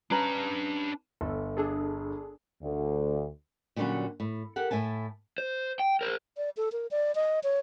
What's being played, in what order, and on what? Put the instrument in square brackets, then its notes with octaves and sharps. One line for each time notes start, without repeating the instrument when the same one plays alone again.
[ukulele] C#4 B4 A#5 [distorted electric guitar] D4 B5
[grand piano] G1 [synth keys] A4
[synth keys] D4 G#4 A4
[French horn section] D2
[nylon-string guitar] A#2 D3 F#3 G3 C#4 F#4
A2
G4 A4 A#4 F#5
A2 E4 G#5 A5
[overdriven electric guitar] C5
G5
A#4 C5
[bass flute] D5
A4
A#4
D5
D#5
C#5